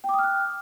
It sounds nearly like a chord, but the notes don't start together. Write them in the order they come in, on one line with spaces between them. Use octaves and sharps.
G5 D6 D#6 F6 F#6